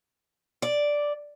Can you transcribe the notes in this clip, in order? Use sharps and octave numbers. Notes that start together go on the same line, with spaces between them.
D5